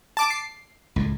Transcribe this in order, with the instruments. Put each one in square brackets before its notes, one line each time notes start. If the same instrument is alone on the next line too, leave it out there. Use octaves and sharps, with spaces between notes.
[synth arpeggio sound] A5 D6
C7
[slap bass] C#2 A2